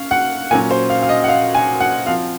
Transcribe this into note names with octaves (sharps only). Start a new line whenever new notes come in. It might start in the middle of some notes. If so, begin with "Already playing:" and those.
Already playing: C#4 F5
F#5
A#2 F#3 C#4 G#5
C5
F5
F5
D#5
F#5
F5
G#5
F#5
F3 C4 F5